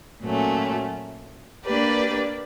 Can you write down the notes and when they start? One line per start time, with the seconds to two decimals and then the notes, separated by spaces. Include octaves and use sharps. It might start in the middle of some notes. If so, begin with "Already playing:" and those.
0.23 A#2 F#3 A3 C#4
1.65 A#3 D4 G4 B4 D5